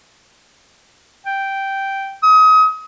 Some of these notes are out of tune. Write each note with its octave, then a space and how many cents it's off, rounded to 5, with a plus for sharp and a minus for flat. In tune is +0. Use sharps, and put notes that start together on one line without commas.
G5 -5
D#6 +30